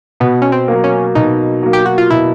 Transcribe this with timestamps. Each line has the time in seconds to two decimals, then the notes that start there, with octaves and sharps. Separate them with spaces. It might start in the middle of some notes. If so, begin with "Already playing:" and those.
0.20 B2 B3
0.42 C#4
0.52 C4
0.68 F#3 A#3
0.84 C#4
1.15 B2 D#4
1.63 F#3 A#3
1.73 G4
1.86 F#4
1.98 F4
2.10 B2 E4